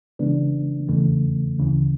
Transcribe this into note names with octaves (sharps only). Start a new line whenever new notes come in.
C#3 E3 G#3 B3 D4
E2 C#3 E3 A3
D2 C#3 E3